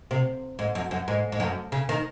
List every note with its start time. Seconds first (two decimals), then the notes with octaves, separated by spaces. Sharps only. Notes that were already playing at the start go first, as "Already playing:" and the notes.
0.11 C3
0.59 G#2
0.75 F#2
0.91 F#2
1.08 G#2
1.32 G#2
1.40 F#2
1.72 C#3
1.89 D#3